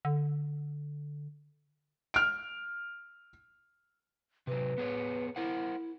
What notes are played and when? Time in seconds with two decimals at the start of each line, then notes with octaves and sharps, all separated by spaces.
0.05 D3
2.14 F6 D7
4.47 C3 F#3 B4
4.78 B3 G#4 C#5
5.36 E4 A#4 C5 F#5